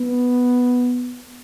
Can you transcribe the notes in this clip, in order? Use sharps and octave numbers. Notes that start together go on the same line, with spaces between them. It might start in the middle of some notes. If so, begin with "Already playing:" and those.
Already playing: B3